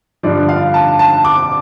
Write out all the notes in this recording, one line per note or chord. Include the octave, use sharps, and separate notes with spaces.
G2 D3 F3 D5
F5
A5
A5
D6